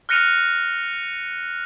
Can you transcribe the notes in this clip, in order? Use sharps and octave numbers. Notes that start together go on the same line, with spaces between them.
F6 F#6 A#6 C#7 D#7 F7